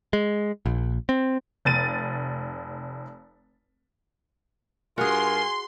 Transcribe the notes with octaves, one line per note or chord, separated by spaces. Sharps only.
G#3
A#1
C4
F1 A6 D#7
G2 F4 F#4 G#4 A#4 G#5 C6